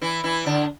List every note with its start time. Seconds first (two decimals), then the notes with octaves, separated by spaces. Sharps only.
0.02 E3 E4
0.24 E3 E4
0.46 D3 D4